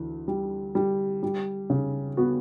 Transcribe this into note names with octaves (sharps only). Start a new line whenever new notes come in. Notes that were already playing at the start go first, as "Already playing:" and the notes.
Already playing: D2 E3
G3
G3
G3
C#3
B3 F#4